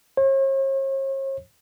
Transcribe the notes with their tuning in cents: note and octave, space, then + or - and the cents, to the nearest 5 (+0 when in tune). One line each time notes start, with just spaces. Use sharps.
C#5 -45